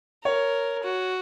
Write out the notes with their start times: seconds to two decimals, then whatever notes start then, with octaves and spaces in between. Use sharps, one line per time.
0.24 A#4 C#5
0.84 F#4